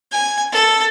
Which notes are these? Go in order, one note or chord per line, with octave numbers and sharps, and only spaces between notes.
G#5
A4